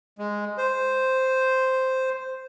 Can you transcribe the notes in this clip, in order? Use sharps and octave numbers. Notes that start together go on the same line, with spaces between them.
G#3
C5